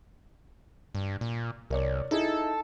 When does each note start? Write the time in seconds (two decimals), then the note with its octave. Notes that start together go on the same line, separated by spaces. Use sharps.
0.95 G2
1.21 A#2
1.70 C2 A#4 C#5 D5
2.11 D#4 E4 G#4 A4